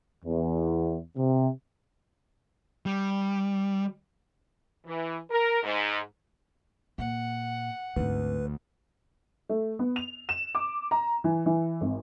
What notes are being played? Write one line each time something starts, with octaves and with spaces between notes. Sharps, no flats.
E2
C3
G3
E3
A#4
G#2
A#2 F#5
G#1 D2 D#3 B4
A3
B3
F7
E7
D6
A#5
E3
E3
G#1